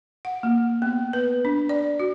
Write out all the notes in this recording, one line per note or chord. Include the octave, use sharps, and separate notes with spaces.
F#5
A#3
B3
B4
D4
D5
F#4